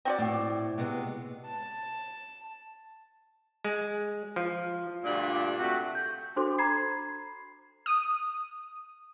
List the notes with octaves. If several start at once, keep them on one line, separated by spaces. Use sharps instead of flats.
C4 F#4 D5
A2
C3 G#3 B3
A5
G#3
F3
D2 G2 A#2 D4
C3 A3 F#4
G6
D4 F#4 A4 C5 C6 D6
A#5 B5 G#6 C7
D#6